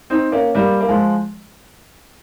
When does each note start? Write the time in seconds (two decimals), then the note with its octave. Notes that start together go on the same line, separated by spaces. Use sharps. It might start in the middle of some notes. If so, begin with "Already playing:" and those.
0.10 C4 D#4
0.32 A#3 C#4
0.55 G3 A#3
0.81 A#3
0.89 F3 G#3